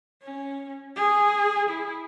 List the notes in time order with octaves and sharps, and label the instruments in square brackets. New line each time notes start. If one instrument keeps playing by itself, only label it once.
[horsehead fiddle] C#4
G#4
E4